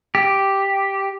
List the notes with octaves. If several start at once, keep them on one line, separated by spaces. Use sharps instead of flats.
G4